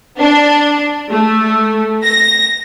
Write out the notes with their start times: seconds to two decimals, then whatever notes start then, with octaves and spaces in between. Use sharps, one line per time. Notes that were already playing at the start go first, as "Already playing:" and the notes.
0.19 D4
1.11 A3
2.04 A#6